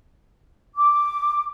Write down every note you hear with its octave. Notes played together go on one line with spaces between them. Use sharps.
D6